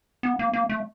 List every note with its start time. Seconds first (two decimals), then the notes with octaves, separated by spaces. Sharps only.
0.23 B3
0.39 A#3
0.53 A#3
0.69 A3